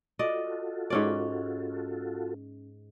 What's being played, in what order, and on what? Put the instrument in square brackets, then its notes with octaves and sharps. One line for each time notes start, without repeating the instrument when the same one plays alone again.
[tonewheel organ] F4 F#4 A4 [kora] D5 D#5
[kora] G#2 C#4 D5